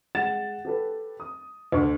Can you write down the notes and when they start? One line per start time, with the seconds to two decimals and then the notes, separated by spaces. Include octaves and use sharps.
0.15 G#3 F#5 A6 E7
0.65 G4 A4 B4
1.20 D#6
1.72 D2 C#6